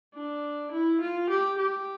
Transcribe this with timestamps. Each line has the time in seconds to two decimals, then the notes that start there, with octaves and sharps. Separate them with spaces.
0.15 D4
0.72 E4
1.01 F4
1.30 G4
1.58 G4